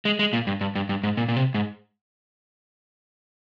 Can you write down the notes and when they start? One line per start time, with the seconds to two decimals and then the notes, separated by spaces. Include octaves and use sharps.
0.05 G#3
0.19 G#3
0.33 A#2
0.47 G2
0.61 G2
0.75 G2
0.89 G2
1.03 G#2
1.17 A#2
1.28 A#2
1.36 C3
1.54 G#2